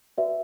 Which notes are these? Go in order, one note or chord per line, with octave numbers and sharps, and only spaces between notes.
F#4 B4 D5 E5